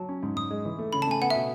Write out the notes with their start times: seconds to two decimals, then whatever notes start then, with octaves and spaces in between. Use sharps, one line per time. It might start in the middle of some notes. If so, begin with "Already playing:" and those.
Already playing: F#3 A5
0.09 C#4
0.23 G#2
0.36 G#2 D#6
0.51 G#3
0.65 E3
0.78 A3
0.93 C#3 B5
1.02 A5
1.07 A3 G#5
1.21 B3 F#5
1.30 E5
1.35 B2